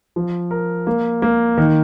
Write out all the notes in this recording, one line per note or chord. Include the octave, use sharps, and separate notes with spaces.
F3
A#4
A#3
A#3
D#3